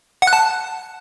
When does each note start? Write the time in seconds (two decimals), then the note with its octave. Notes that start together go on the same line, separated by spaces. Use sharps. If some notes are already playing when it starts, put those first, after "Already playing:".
0.22 F#5
0.27 F#6
0.33 A5